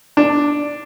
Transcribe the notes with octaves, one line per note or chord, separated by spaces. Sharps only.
D4